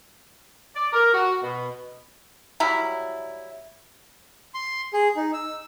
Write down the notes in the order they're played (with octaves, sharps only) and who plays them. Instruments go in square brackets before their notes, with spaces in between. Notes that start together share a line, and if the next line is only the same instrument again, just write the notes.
[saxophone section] D5
A#4
F#4
B2
[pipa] F#3 G3 E4
[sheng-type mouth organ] C6
G#4
D#4
E6